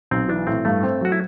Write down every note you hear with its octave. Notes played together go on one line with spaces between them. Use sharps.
B1 C4
E3 D4
A2 C4
G2 A3
C4
F#3 F#4
E4